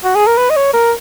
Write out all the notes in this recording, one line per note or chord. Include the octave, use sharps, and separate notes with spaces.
F#4
G#4
A#4
B4
D#5
C#5
A#4